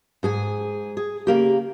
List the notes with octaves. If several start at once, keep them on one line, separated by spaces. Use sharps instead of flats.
G#2 G#4 G#5
G#4
C#3 A#3 G4